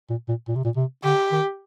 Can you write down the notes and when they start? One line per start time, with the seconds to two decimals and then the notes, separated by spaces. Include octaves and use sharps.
0.10 A#2
0.28 A#2
0.48 A#2
0.56 C3
0.65 A#2
0.76 C3
1.04 D3 G4
1.32 D#3